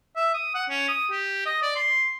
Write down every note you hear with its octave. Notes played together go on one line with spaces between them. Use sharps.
E5
D#6
F#5
C#4
D#6
G4
D#5
D5
C6